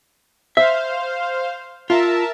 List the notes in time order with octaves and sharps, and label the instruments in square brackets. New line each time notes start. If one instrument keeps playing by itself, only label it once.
[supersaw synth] C5 F5 [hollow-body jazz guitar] E5
[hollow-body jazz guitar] F4 [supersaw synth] A#4 E5 A5